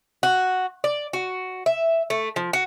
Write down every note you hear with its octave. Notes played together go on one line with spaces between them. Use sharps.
F#4
D5
F#4
E5
A3
F3
F#4